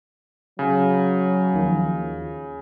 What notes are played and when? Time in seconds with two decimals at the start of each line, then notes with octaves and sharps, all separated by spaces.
0.59 C#3 F#3
1.53 D#2 D#3 F3